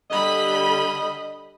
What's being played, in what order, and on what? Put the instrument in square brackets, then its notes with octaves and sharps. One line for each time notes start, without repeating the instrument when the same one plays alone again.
[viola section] D3 G3 B5 [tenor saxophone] D#5